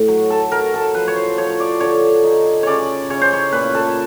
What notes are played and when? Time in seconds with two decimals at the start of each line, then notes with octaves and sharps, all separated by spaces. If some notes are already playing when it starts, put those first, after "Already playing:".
Already playing: A2
0.08 F#3
0.30 A4
0.52 F#3 A#4
0.74 A4
0.94 F3 B4
1.08 C#5
1.16 C5
1.38 F3 C#5
1.60 D5
1.80 D3 C#5
2.24 D#4
2.63 C#3 C#5 D5
3.10 C#3 C#5
3.21 C5
3.33 C#5
3.52 A#2 B4
3.75 A4